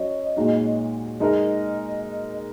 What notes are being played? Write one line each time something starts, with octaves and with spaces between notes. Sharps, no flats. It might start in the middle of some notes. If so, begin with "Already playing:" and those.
Already playing: F#3 C#4 C#5 D#5
A#2 G#3 D#4 F#4
G#3 D#4 A#4 D#5